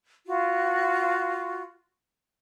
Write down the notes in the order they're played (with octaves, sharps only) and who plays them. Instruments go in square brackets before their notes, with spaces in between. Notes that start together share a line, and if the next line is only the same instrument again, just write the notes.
[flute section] F4 F#4